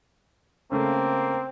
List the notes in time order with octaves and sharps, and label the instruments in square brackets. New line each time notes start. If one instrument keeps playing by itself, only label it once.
[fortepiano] C#3 A3 [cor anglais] A#3 [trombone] C4